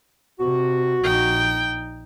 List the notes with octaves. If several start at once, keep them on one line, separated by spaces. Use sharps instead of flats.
C3 F#4
A#1 D#4 G5